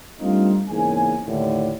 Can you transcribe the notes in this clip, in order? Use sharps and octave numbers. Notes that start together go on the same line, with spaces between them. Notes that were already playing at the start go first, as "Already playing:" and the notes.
G3 A3 C4 D4 D#4 F4
E2 G#2 C#3 A#3 G#5
D#2 A2 D3